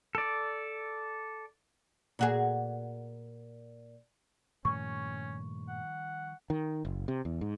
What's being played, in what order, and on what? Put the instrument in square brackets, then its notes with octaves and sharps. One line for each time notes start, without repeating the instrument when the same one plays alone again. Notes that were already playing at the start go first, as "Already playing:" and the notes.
[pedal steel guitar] A4 D5
[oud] A#2 F#4 G#4
[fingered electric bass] G2 A#2 A3 [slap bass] D#3 F3 G3 [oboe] C#4 [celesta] C#6
[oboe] F#5
[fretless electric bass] D#3
F#1
C3
E2
G#2